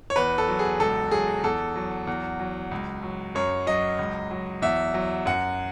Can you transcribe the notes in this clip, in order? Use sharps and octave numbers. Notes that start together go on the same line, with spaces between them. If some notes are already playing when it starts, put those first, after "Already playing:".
C#5
E2 B4
A4
F#3
G#4
C#2 A4
F#3 G#4
E2 A4
F#3
E2
F#3
C#2
F#3
F#2 C#5
F#3 D#5
C#2
F#3
E2 E5
F#3
F#2 F#5